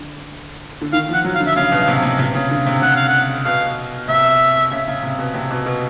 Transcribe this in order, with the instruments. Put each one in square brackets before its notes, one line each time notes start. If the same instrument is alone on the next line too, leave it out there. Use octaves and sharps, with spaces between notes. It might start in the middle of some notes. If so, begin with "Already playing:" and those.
Already playing: [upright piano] D3
D3
[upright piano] D#3 [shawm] F5
[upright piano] F3
[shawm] F#5
[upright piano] F#3
[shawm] F5
[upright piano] D3
[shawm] E5
[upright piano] C#3 [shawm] F5
[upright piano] B2
C3
C3
C3
C#3
D3
C3
[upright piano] C3 [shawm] F#5
[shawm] F5
F#5
[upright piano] B2 [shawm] F5
[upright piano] C3 [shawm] E5
[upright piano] C#3
C#3
C3
B2
C3
B2
B2